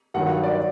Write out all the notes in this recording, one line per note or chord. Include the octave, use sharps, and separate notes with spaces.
G2 D#3 F#3 F#5
D5